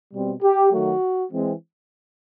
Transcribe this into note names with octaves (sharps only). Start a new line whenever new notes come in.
B2 G3 C4
G4
D#3 F#3 A3 F#4
E3 G#3 C4